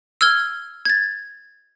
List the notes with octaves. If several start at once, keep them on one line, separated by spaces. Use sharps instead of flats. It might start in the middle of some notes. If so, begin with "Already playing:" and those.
E6 F6 G#6 G7
G#6 A6